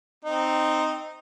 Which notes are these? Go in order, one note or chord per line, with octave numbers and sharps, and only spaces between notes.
C4 D#4